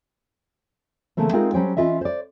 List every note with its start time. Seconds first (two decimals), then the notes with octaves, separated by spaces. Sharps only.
1.17 C#3 E3 F3 A3 A#3 C4
1.33 G#3 C4 D#4 F4 G#4 A#4
1.54 F#3 G3 C#4 C5 C#5 G5
1.77 E3 A#3 C#4 F4 D#5 E5
2.01 C5 D5